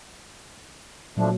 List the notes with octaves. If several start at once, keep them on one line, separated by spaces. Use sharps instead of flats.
A#2 F3 F#3 A3 D4